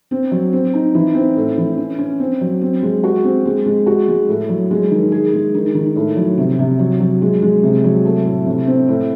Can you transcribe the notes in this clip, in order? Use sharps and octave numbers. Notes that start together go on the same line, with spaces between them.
C4
F#3
C4
D#4
E3
C4
A2
E3
C#4
C#4
C4
F#3
C4
G#3
F#4
C4
G#3
G#3
F#4
G#3
A2
F#3
G#3
D#3
G#4
G#3
D#3
D#3
A2
F#3
C3
C3
F#3
F#3
G#3
G#3
C3
F#3
A3
A2
C3
C4
A2